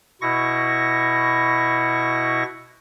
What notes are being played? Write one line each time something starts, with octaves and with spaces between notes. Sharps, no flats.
B2 E4 C#6 A#6